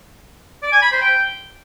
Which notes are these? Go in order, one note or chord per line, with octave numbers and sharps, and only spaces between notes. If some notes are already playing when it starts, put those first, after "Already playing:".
D5
G#5
B5
C5
G5